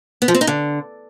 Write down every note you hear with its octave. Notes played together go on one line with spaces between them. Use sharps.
B3
F3
C4
D#4
D3